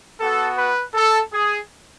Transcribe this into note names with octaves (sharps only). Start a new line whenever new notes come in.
B3 F#4 A4
B4
A4
G#4